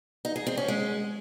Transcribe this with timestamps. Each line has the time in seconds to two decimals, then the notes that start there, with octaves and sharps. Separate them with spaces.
0.25 D#4
0.36 G#4
0.47 C4
0.57 C#4
0.68 G#3